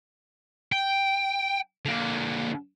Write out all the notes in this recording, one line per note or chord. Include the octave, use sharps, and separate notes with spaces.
G5
D3 A#3